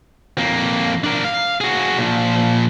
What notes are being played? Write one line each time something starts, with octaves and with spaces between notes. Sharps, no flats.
F2 A#3
D4 A#4
F5
F#4 G#4
A#2 F3